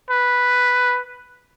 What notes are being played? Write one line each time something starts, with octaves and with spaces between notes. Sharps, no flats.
B4